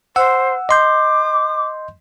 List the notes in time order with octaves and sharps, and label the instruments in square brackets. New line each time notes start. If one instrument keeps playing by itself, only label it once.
[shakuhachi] C5 [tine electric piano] F#5 E6
[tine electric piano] D#5 C6 G6 [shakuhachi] D6